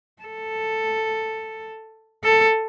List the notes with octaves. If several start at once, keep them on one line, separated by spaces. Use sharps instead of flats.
A4
A4